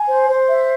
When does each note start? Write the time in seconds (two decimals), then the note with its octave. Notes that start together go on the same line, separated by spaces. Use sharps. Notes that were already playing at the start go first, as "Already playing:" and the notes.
Already playing: G#5
0.08 C5
0.29 C5
0.49 E5